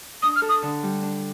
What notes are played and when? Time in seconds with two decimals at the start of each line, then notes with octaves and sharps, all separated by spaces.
0.23 D4 D#6
0.36 F6
0.42 A4
0.49 D#6
0.63 D3
0.83 G3
1.03 D4